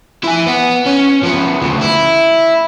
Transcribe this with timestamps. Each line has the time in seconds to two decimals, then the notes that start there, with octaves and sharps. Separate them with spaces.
0.23 E4 G#5
0.46 B3
0.86 C#4
1.23 F3 B3
1.62 D2 C#3
1.82 E4